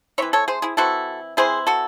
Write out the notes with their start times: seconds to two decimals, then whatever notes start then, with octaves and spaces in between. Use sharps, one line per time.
0.18 E3 C4 E4 C#5 E5
0.33 A4 C#5
0.48 G#4 C5
0.62 E4 G#4
0.77 E3 C4 E4 F#4 A4
1.37 E3 C4 E4 G#4 C5
1.67 F#4 A4